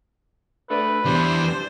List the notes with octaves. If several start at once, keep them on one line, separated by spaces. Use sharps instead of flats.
A3 D4 B4
E2 G3 D4 C5